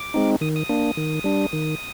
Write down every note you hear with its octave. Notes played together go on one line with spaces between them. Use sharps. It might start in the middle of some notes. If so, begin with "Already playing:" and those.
Already playing: D6
G#3 C4 D#4
D#3 D#6
D#6
A#3 D4
D#3
G3 D4
D#3